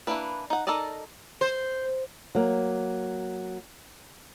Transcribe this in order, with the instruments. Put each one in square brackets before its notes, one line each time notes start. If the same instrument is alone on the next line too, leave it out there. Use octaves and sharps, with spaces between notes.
[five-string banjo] E3 F#3 A#3 D4 B4
D#4 F#5
D#4 A4 A#4 D5 D#5
[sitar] C5
[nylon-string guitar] F#3 A#3